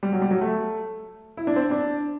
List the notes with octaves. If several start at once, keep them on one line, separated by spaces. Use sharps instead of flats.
G3
F#3
G3
F#3
A3
E4
D4
C4
D4